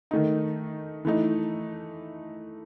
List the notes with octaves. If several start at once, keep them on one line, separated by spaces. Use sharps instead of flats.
D#3 A3 D#4
E3 A3 D#4